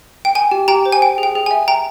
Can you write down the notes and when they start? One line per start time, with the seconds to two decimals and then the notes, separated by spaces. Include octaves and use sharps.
0.25 G5
0.35 G5 G#5
0.51 G4
0.68 G4 G5 A#5
0.86 C5
0.92 G#5
1.02 G5
1.18 G#4
1.23 G5
1.35 G#4
1.46 E5 G#5
1.68 G5 A#5